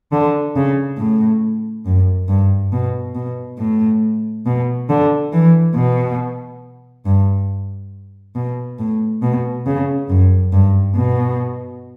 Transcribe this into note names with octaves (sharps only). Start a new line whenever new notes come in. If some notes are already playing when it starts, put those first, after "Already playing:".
D3
C#3
A2
F#2
G2
B2
B2
A2
B2
D3
E3
B2
G2
B2
A2
B2
C#3
F#2
G2
B2